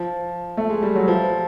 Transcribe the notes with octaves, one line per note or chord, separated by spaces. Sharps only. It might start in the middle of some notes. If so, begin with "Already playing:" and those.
Already playing: F3
A3
G#3
G3
F#3
F3